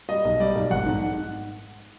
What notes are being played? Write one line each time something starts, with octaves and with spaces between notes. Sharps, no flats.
G3 D#5
B1
G3 D5
B1
G#1 F#5
G#2